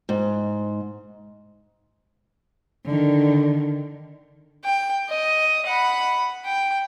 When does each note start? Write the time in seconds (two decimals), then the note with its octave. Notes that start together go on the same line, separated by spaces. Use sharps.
0.09 G#2
2.85 D3 D#3
4.64 G5
5.08 D#5
5.66 F#5 B5
6.45 G5